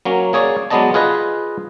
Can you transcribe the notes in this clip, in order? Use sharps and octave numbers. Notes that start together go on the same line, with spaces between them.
F#3 A#3 C#4
A#3 G#4 C#5 D5
F#3 G#3 B3 D5 D#5 A5
F4 G#4 B4 D#5